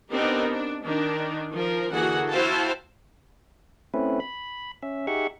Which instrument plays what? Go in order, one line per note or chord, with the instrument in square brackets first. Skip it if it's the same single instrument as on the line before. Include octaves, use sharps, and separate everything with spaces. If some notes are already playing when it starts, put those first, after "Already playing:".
[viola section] B3 C4 D4 D#4 G4 A#4
D4
D#3 D4
F3 A#4
D3 E3 A#3 F#4 G#4 F#5
E4 F#4 C5 F5 G5 A5
[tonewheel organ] A3 C4 C#4 E4 B4
B5
C#4 E5
D#4 G4 G#4 E5 F#5 C#6